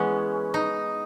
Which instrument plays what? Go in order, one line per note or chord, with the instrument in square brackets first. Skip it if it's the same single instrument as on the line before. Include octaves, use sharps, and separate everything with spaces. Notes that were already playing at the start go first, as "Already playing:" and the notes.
Already playing: [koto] E3 G#3 B3 C#4
D#4